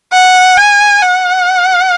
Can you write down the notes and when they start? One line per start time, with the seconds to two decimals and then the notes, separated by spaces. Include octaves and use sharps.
0.12 F#5
0.57 G#5
1.01 F#5